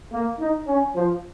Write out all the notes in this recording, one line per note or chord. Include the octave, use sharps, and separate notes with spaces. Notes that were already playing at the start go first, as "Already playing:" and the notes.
A#3
D#4
C#4
F3